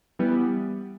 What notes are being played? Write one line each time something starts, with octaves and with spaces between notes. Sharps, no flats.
E3 G3 B3